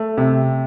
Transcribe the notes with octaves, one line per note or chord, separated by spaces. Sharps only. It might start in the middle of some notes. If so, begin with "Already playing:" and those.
Already playing: A3
C3